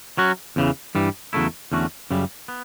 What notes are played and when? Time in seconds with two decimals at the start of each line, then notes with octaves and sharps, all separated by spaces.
0.18 F#3 C#4 F#4
0.56 E2 C#3 E3
0.95 G2 E3 G3
1.33 E2 C#3 F#3 A3 E4
1.72 E2 D3 A3 C#4 F#4
2.11 F#2 C#3 G3
2.48 B3